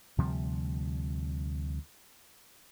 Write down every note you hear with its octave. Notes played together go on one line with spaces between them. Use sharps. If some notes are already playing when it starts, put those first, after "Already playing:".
D2 C3 F3 G3